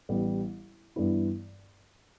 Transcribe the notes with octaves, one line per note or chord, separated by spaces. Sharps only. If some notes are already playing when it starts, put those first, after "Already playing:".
A1 A2 G3 B3
G2 E3 B3 E4